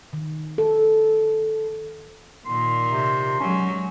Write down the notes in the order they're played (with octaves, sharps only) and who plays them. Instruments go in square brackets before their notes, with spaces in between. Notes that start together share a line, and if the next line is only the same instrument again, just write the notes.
[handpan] D#3
A4
[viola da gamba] A#2 D#3 [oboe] C6
[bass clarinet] C3
[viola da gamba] F#3 G#3 [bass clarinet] C#4